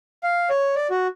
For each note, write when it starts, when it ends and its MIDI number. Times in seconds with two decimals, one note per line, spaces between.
0.23 0.49 77
0.50 0.75 73
0.76 0.88 74
0.90 1.07 66